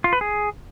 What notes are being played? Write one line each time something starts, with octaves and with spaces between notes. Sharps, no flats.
F4
B4
G#4